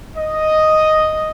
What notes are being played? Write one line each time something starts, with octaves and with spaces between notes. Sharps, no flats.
D#5